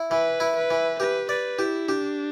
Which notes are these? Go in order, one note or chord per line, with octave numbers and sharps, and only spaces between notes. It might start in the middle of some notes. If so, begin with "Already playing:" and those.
Already playing: E4
E3 B4
E4
B4
E3
G4 B4
B4 D5
E4 G4
D4 G4